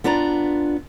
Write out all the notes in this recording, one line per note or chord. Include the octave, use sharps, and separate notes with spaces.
B3 D4 F4 D5 A#5